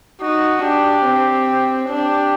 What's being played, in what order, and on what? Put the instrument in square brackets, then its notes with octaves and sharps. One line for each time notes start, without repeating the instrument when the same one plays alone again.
[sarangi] D#4 [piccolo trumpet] F#4
[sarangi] D4 [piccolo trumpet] G4
[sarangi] C4
[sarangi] D4 [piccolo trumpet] G4